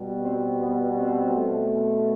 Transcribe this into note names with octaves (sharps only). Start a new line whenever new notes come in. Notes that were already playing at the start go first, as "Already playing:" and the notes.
Already playing: B2 G3
C4
B3
C4
B2 A3